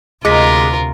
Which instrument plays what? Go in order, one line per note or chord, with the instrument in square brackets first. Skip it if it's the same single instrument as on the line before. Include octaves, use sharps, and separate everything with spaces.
[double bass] D2 C3 [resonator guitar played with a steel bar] G#3 [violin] F4 A#4 [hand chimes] D6 A#6 B6